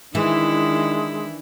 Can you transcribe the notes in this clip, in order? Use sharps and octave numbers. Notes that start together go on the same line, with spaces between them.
D#3 E3 G#3 D4 E4